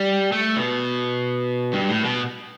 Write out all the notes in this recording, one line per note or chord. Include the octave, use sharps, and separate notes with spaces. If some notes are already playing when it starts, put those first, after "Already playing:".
Already playing: G3
A3
B2
G2
A2
B2